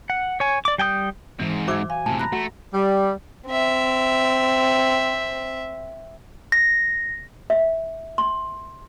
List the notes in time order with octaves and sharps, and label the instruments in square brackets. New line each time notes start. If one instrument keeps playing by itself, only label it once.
[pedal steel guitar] F#5
C#5 G#5
D5 D6
G3 G5 G#5 D#6 G6
[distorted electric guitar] G#2 C4 [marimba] E3
[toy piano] F#4 C5 D6 [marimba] E5 E6 G#6
[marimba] F5 [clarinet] G#5
[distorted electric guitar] A2 C3 [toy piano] A5
[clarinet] A#5 [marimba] B5 F#6
[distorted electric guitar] A3 [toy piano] F#4 F#5
[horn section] G3
[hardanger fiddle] C4 E5
[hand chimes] A#6
[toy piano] E5
C6